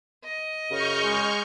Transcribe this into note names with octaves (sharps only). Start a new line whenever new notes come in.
D#5
F#2 C#3 C#6 F6 G6
G#3